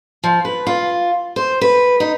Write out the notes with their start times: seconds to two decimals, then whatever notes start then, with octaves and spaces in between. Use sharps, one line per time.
0.24 F3
0.45 B4
0.67 F4
1.36 C5
1.61 B4
2.00 D#4